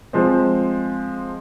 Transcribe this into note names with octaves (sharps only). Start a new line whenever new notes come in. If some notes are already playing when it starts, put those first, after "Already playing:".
F3 G#3 C4